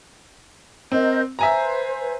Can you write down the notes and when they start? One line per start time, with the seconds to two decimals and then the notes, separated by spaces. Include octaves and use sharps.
0.92 C4 A#4 D#5 G6
1.39 B4 C5 E5 G#5 A#5